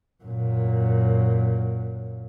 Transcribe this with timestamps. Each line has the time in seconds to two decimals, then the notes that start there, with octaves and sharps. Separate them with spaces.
0.23 F#2 A#2